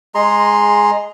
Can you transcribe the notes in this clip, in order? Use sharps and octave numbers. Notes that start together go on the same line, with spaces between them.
G#3 G#4 A#5 C6